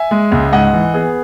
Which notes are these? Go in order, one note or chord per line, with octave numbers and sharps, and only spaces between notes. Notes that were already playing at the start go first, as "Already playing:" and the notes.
Already playing: E5 G#5
G#3
C#2
G#2 D#5 F#5
E3
B3 G#4